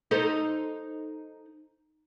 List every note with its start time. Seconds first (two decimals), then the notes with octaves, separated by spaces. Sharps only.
0.11 D#4 A4 C5